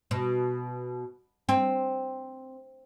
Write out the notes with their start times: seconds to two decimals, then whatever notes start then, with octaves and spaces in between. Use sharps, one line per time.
0.11 B2
1.49 C4